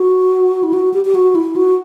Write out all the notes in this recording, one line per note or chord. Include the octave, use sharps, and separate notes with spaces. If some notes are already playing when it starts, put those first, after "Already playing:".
Already playing: F#4
E4
F#4
G4
G4
F#4
E4
F#4